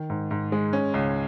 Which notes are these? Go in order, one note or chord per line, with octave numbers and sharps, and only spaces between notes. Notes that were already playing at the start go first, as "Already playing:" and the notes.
Already playing: D#3
G#2
G#2
G#3
C#4
C#2